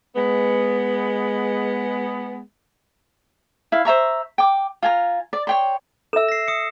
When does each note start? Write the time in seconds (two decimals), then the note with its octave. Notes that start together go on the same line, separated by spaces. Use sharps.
0.16 G#3 B3
3.72 E4 F5
3.85 C5 E5 A#5 C#6
4.38 G5 D6
4.83 F4 G#5 A#5
5.33 D5
5.47 C#5 G5 C6
6.13 A4 E5 E6 E7
6.28 A#6 C7
6.48 D#6 C#7